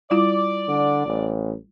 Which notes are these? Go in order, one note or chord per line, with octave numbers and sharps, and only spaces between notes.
G3 E4 F4 D5
D3
A1